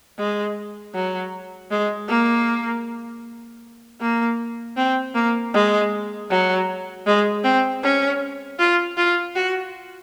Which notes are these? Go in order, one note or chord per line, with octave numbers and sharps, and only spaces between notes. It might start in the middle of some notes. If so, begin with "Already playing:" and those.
G#3
F#3
G#3
A#3
A#3
C4
A#3
G#3
F#3
G#3
C4
C#4
F4
F4
F#4